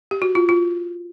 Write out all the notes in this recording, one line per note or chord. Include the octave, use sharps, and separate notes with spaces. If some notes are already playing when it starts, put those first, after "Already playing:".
G4
F#4
F4
F4